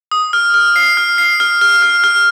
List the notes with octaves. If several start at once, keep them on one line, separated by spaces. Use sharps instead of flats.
D#6
F6
F6
C7
F6
C7
F6
F6
F6
F6